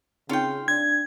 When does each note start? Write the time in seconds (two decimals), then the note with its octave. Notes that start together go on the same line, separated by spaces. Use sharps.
0.29 C#3 C4 D#4 F4 G5
0.68 D4 G#6